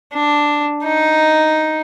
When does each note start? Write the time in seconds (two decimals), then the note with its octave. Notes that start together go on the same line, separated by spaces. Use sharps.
0.13 D4
0.83 D#4